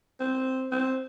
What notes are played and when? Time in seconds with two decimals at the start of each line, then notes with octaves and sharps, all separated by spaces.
0.20 C4
0.72 C4